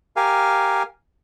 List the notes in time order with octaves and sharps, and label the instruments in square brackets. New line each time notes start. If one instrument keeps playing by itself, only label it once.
[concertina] G4 A#4 F5 G#5